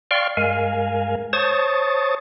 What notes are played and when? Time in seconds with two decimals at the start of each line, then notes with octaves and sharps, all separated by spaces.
0.11 D5 F5 G5 C6 C#6 F6
0.37 G2 G#3 A#4 F5 G#5
1.33 C5 C#5 A5 C#6 D#6 A6